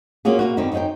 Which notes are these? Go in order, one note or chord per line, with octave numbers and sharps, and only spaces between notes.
A#3 C#4 F4 F#4 G#4
B2 A#3 F#4
F#2 D3 D#3 B3 C4
F#2 D#4 G#4 C5 G5